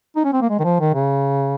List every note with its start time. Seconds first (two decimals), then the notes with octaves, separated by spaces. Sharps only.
0.16 D#4
0.24 C#4
0.33 C4
0.42 A#3
0.50 G#3
0.59 D#3
0.64 F3
0.80 D#3
0.94 C#3